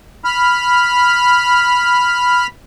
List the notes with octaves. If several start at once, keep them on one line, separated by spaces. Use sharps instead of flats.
B5 F6